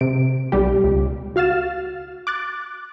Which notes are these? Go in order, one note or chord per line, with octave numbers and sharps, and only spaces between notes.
C3 D7
B1 G3 G4
C#2
F#4 F5 F6 A6 E7
D6 F#6 A6